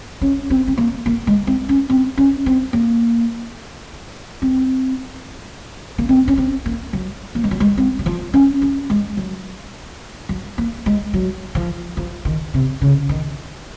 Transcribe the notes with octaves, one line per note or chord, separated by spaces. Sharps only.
C#4
C4
C4
A#3
A#3
G#3
C4
C#4
C4
C#4
C4
A#3
C4
A#3
C4
C#4
C4
A#3
F#3
A#3
G#3
F#3
G#3
C4
F#3
F3
C#4
C#4
G#3
F#3
F#3
A#3
G#3
F#3
F3
F3
D#3
C3
C#3
D#3